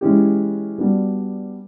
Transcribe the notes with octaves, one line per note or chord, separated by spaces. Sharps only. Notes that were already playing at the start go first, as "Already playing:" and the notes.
E3 G#3 C#4 E4 G4
G3 B3 D4 F#4